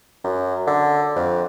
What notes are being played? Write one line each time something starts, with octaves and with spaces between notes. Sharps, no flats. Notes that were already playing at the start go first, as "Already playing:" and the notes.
F#2
D3
F2